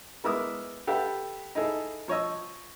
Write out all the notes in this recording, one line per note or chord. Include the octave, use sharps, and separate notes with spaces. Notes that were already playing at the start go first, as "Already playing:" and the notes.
G#3 B3 E4 A#4 D6 D#6
G4 A4 B4 E5 F#5
D#4 E4 G#4 A4
F3 C#5 D#5 E6